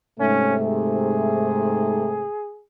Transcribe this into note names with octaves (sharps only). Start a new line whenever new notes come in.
G#2 C3 A3 C#4
G#4